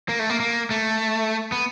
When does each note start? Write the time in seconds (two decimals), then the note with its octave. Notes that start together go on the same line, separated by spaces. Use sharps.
0.09 A#3
0.19 A3
0.30 A#3
0.40 A#3
0.71 A3
1.52 B3